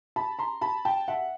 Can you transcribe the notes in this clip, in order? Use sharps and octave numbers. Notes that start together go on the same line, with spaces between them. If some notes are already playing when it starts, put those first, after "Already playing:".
A5 B5
A#5 C6
A5 B5
G5 A5
E5 F#5